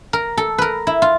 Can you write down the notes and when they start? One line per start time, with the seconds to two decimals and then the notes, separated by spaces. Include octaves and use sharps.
0.13 A#4
0.37 A4
0.58 A#4 B4
0.87 E4
1.02 F4